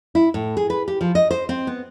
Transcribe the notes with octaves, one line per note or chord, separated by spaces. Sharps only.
E4
A2
G#4
B4
G4
F3
D#5
C5
C4
B3